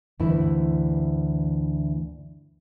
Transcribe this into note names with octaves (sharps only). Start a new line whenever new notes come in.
D2 G2 E3 E4